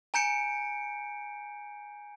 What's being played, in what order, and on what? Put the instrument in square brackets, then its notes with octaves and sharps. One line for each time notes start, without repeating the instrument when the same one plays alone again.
[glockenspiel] G#5 A#5 G6 C#7 D7